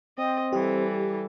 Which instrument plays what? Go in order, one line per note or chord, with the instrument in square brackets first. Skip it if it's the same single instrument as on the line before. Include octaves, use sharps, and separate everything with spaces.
[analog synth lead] C4 [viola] D#5
[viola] E3 A4 [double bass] G3 [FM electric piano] G4